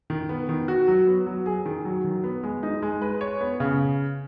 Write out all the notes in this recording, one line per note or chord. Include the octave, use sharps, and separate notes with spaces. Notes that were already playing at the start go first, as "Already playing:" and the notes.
D#3
B3
D#3
F#4
F#3
B3
F#3
G#4
D#3
F#3
D#3
B3
G#3
D#4
G#3
B4
C#5
B3
C#3